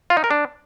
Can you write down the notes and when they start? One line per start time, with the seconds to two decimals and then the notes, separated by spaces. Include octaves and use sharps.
0.10 F4
0.17 D#4
0.24 A#4
0.31 D4